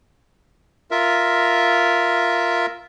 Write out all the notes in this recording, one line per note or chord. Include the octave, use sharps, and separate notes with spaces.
F4 A#4 E5